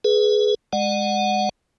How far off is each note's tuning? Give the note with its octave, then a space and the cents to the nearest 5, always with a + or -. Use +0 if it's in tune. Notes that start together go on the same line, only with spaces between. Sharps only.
G#4 +20 B4 +0
G#3 -5 D5 +40 F#5 +0